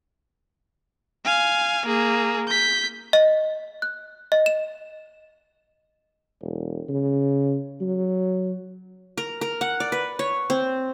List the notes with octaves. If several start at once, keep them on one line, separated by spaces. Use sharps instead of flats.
F5 G#5
A#3 G#4
G6 B6
D#5
F#6
D#5
E7
E1
C#3
F#3
A#4
A#4
F#5
D5
B4
C#5
C4